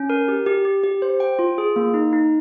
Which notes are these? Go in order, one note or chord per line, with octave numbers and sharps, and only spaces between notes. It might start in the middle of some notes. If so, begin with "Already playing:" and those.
Already playing: C#4
A#4
G4
G4
G4
G4
C5
G5
F4
G#4
A#3
D#4
D#4